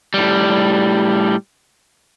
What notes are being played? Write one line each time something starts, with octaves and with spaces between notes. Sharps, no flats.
A2 G3